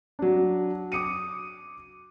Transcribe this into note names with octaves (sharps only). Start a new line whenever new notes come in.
F#3 D4
D6 D#6 C#7 D#7